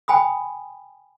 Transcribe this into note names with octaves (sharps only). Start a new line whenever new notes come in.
G5 G#5 B5 D#6